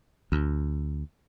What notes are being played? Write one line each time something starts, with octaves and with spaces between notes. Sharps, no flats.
D2